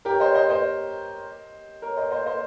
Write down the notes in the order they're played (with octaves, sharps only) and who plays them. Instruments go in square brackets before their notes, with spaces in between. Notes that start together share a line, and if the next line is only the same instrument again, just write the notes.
[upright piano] G4 A#4
C#5
C5 D#5
C5 D#5
C5 D#5
A#4 C#5
C5 D#5
C5 D#5
C5 D#5